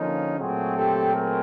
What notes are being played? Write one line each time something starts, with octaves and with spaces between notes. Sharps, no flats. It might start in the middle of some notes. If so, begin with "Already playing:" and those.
Already playing: D3 F3 A#3 C#4 D#4
A#2 F#3 A3 C4 F#4 G#4
G4 A4
G#4 A#4